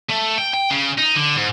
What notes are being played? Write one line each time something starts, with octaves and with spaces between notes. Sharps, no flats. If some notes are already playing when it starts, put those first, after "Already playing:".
A3
G5
G5
C#3
D#4
D3
G#2